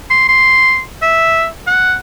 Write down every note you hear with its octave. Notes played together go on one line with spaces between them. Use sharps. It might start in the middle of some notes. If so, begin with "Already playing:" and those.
C6
C6
E5
F#5